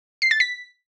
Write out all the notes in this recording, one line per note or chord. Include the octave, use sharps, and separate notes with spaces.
C7
A6
B6